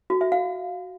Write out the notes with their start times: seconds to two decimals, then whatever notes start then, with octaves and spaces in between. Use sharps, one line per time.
0.10 F#4
0.21 E5
0.32 F5